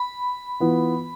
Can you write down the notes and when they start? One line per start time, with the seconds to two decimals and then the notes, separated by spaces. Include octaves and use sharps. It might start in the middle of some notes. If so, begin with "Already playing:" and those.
Already playing: B5
0.60 E3 B3 F4